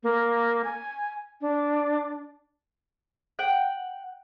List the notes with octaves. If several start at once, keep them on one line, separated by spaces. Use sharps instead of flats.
A#3
G#5
D4
F#5 G5